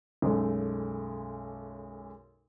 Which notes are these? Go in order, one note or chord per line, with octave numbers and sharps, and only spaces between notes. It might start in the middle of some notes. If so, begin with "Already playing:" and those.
B1 F#2 G#3 A3